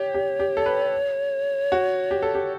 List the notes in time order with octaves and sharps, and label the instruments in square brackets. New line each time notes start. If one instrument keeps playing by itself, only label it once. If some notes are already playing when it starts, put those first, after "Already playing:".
Already playing: [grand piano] G4 [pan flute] C#5
[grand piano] G4
G4
A4
B4
F#4
G4
A4
G4